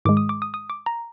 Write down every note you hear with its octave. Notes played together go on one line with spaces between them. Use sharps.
G#2 D#3 G#3 D6
D#6
D6
D#6
D#6
D6
A#5